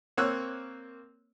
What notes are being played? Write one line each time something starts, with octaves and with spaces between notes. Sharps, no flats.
A#3 C4 C#5 E6 F#6